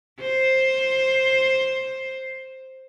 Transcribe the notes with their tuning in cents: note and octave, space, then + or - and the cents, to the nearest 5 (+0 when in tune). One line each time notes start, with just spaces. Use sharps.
C5 +10